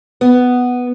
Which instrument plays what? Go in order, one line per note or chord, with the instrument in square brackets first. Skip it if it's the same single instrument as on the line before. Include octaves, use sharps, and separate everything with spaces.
[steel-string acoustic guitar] B3